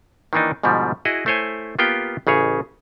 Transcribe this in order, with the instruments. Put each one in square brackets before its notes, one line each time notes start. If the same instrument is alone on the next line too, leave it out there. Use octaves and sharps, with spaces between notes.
[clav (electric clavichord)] D#3 E3 A#3 D4 D#4
G#2 B2 D3 F3 G3
E4 F#4 G#4 D#5
A3 E4 C5 C#5 G#5
A#3 B3 F4 G4 G5
A1 C#3 G#4 C#5